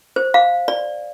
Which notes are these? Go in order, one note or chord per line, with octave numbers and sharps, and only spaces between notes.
C5
F5
D5